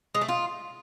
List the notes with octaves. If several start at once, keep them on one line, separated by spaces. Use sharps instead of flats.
G#3
A3
F4